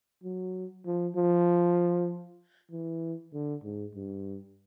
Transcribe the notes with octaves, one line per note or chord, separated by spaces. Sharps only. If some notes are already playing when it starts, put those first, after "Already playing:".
F#3
F3
F3
E3
D3
G#2
G2